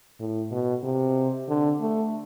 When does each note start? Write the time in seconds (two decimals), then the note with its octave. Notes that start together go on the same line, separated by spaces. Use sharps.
0.20 A2
0.51 B2
0.83 C3
1.48 D3
1.81 A3